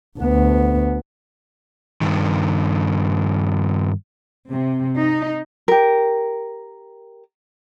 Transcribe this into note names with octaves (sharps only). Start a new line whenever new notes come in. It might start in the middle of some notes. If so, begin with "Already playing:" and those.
D2 B3
G2 D#3
C3
D#4
G4 A#4